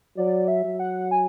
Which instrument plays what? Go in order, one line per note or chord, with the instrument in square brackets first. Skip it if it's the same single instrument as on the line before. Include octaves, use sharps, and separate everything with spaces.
[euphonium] F#3 [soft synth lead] D5
[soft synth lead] E5
[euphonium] F#3
[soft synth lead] F#5
G#5